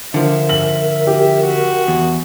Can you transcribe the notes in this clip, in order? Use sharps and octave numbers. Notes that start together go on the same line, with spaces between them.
D3 F3 A#4 E5
F#7
G4
F#4
E2